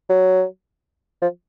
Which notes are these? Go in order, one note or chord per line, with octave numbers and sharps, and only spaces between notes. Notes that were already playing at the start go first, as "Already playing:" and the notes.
F#3
F3